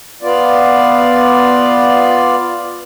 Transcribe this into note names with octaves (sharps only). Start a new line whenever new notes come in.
B3 F4 D5